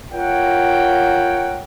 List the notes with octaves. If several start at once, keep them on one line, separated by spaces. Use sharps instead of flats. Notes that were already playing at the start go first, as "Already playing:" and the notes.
F4 A#4 C#5 F#5 G5